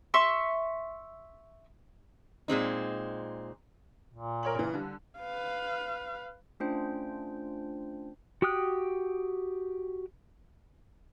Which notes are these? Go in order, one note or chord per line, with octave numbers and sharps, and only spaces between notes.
E5 C6 C#6 E6
A#2 G#3 C4 D#4
A#2
A#4 C#5 F#7
C#3 E3
D3 G3
B4 F5
A3 C#4 D4 F4 C5 G5
F#4 G4 G5 D#6 F#6